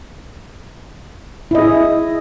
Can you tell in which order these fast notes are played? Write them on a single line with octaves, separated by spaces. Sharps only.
E4 D#5 G#4